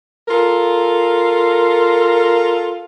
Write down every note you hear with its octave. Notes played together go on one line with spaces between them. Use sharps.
F4 A4 A#4